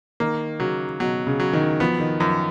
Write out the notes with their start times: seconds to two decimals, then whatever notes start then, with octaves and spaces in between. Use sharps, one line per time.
0.20 D#3 A#3
0.60 C#3 F#3
1.00 B2 F#3
1.27 C#3
1.40 F#3
1.53 D#3
1.80 F3 B3
2.00 D#3
2.20 F#2 F3